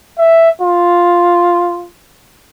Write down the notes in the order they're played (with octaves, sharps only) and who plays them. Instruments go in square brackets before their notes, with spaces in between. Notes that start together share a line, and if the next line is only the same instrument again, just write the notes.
[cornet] E5
F4